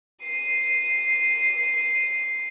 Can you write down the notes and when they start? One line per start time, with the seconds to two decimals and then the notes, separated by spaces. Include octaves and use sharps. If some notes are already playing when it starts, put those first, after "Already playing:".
0.23 C7 D#7